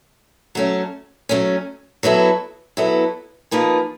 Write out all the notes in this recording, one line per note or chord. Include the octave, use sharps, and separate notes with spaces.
F#3 A3 C#4
F#3 A3 C#4
F#3 B3 E4 A4
F#3 B3 E4 A4
F3 A#3 D#4 G#4 B4